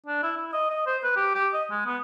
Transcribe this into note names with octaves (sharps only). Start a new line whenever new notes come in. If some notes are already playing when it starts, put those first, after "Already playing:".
D4
E4
E4
D#5
D#5
C5
B4
G4
G4
D#5
G#3
B3